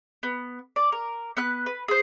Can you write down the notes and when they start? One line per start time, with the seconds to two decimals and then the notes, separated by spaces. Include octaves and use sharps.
0.23 B3
0.76 D5
0.92 A#4
1.37 B3 B4 F#6
1.66 B4
1.88 G#4 C5